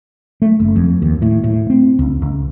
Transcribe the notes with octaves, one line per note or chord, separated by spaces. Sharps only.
A3
F#1
F2
D#2
A2
A2
C4
C#2
C#2